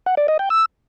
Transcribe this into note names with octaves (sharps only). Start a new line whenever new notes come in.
F#5
D5
D#5
G5
E6